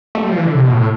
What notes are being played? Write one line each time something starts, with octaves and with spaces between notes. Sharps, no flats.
A3
G3
F3
E3
D3
C3
B2
A2